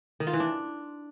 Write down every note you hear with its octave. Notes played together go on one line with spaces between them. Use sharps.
D#3
F4
E3
D4